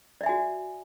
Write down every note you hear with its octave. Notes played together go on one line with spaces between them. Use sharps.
F#4 D5 E5 G#5